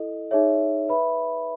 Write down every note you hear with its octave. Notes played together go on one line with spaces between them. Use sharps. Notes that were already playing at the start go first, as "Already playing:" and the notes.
Already playing: E4 A4 D#5
D#4 G#4 C#5 E5
B4 E5 B5